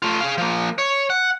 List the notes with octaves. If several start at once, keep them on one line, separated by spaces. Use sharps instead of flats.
A3 F4
G#4 F5
F3 A#3
C#5
F#5